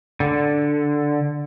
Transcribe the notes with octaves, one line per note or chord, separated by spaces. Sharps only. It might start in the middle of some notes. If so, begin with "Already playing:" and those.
D3